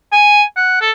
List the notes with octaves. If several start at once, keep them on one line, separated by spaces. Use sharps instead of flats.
G#5
F#5
A4